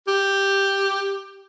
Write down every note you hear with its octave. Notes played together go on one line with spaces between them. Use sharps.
G4